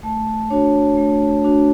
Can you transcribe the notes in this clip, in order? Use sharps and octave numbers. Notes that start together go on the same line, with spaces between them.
A3 A5
D4 F#4 C#5
A3
D4 F#4